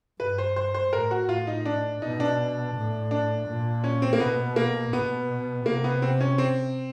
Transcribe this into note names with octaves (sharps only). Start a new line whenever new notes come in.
G2 B4
C5
C5
C5
A2 A#4
F#4
A2 F4
D#4
D4
B2 D#4
D4
A2
D4
A#2
C#4
C4
A#3
B2 B3
A#3
B2 B3
C3 A#3
B3
C4
C#4
C4